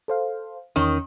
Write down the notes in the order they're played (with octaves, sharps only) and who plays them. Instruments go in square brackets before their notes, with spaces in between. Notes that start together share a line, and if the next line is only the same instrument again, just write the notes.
[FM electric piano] A4 C5 F5
[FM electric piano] E2 C#4 D#6 [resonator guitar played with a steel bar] D#3